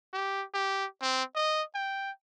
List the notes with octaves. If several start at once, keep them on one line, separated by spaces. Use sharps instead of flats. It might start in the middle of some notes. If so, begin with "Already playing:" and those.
G4
G4
C4
D#5
G5